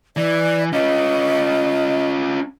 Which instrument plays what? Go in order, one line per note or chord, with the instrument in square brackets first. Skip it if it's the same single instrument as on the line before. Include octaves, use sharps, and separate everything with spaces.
[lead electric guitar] E3 [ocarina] D5
[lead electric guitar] C#4 F4 [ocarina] D#5